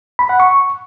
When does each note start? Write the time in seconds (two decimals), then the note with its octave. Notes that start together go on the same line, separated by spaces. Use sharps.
0.19 B5
0.29 F#5
0.40 C#6